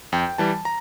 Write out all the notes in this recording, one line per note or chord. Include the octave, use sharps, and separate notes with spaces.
F2 G5
E3 G3 A5
A#5